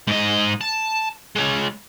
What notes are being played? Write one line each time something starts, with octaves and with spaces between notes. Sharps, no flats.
G#2 D#5
A5
G#3 C#5